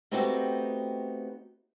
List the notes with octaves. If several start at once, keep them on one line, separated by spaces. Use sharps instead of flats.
A3 B3 C4 D#4 F#4 G4